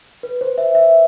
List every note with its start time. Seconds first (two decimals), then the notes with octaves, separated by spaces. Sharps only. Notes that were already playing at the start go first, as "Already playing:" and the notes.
0.23 B4
0.41 C5
0.58 E5
0.75 E5